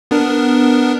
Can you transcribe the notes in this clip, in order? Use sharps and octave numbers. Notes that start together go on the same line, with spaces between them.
B3 D4 A#4